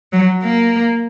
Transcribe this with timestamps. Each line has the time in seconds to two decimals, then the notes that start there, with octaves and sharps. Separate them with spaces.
0.13 F#3
0.44 A#3